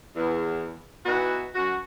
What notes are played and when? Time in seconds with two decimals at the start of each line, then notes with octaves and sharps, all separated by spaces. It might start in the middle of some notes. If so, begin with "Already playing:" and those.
0.16 E2
1.06 E3 B3 D#4 F#4
1.55 F#2 F#4